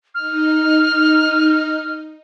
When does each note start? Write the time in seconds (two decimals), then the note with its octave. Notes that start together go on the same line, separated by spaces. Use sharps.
0.15 D#4 F6